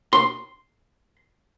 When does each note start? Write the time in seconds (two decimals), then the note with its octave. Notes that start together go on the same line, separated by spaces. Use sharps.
0.13 C6